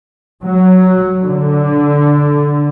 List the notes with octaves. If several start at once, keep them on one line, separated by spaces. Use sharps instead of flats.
F#3
D3